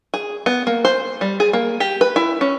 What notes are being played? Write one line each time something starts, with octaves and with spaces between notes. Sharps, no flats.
G#4
B3
A#3
C5
G3
G#4
A#3
G4
B4
E4
C#4